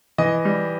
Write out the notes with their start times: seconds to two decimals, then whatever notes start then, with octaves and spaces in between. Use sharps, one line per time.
0.18 E3 D#5
0.45 G3